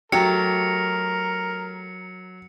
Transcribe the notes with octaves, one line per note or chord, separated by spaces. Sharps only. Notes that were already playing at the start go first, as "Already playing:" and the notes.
F#3 A3 G4 A#4 C#7